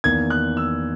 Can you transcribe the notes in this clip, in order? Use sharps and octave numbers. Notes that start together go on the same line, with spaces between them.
E2 D#3 A#3 G#6
F#6
E6